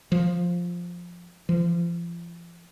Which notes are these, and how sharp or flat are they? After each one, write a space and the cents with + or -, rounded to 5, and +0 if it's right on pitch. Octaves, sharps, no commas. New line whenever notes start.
F3 +5
F3 -35